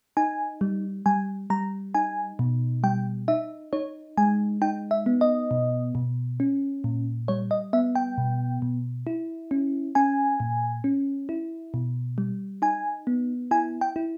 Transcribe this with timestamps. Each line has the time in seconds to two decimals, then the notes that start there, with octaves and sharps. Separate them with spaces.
0.17 D#4 G#5
0.61 G3
1.06 G3 G#5
1.50 G3 A#5
1.95 D#4 G#5
2.39 B2
2.84 G3 G5
3.28 D#4 E5
3.73 D#4 C#5
4.18 G#3 G#5
4.62 D#4 G5
4.91 E5
5.06 B3
5.21 D#5
5.51 B2
5.95 B2
6.40 C#4
6.84 A#2
7.28 G3 C#5
7.51 D#5
7.73 B3 E5
7.95 G5
8.18 B2
8.62 B2
9.07 E4
9.51 C#4
9.95 C#4 G#5
10.40 A#2
10.84 C#4
11.29 E4
11.74 B2
12.18 G3
12.62 D#4 G#5
13.07 B3
13.51 E4 G#5
13.81 G5
13.96 E4